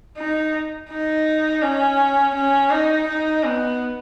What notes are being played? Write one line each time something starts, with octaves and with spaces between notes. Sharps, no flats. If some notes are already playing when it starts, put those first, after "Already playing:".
D#4
D#4
C#4
C#4
D#4
D#4
B3